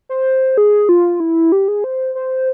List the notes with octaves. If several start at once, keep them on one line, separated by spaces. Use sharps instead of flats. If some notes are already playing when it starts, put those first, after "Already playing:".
C5
G#4
F4
E4
G4
G#4
C5
C5